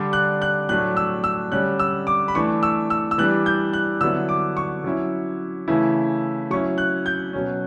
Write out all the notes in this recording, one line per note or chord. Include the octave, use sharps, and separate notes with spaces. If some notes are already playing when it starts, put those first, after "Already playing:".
Already playing: D3 G3 D4
F#6
F#6
A2 F#3 A3 D4 F#6
E6
E6
D3 G3 C#4 F#6
E6
D6
B5
E3 A3 D4 C#6
E6
E6
E6
E3 G3 D4 F#6
G6
F#6
D3 F#3 B3 E4 E6
D6
C#6
F#3 C#4 E4
C#3 E3 A3 E4
F#3 C#4 E4 C#6
F#6
G6
B2 F#3 C#4